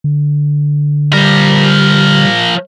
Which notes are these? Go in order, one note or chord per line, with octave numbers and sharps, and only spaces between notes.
D3
F3 G3 A#4